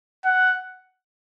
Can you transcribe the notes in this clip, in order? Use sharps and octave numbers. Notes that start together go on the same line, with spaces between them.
F#5